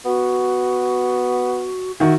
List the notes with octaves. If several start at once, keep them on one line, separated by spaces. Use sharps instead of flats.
B3 F#4
D#3 F#4 E5